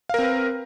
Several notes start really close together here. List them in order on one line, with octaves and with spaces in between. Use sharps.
F5 A#4 C4 B4